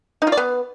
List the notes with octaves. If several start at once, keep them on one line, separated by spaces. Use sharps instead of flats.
D#4
F4
D5
B3